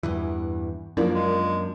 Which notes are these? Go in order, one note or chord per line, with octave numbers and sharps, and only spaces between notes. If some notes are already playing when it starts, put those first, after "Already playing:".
E2 G2 E3
F#2 F3 A#3 D4
G#3